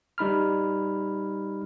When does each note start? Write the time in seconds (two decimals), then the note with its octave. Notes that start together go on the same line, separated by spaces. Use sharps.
0.18 G3 D#4 B5 F6